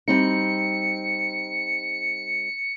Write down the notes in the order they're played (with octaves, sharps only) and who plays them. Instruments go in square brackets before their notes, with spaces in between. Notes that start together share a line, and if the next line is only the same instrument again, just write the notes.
[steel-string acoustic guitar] G3 C4 D#4 [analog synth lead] C#7